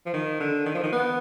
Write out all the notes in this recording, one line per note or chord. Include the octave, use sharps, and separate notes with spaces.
F3
D#3
D3
D#3
F3
D#3
B3